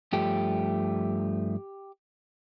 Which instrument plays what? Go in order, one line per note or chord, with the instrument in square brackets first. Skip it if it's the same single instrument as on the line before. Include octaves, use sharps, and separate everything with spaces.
[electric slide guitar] G2 F3 A3 G4